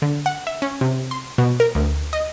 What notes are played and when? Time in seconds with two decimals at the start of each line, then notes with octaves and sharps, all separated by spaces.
0.02 D3
0.26 F#5
0.47 E5
0.62 C#4
0.81 C3
1.11 C6
1.38 B2
1.60 A#4
1.75 D2
2.13 D#5